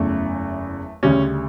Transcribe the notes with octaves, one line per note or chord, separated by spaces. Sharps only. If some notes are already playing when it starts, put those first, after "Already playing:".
Already playing: F#1 E2 C#3 A3
D2 C#3 G3 C#4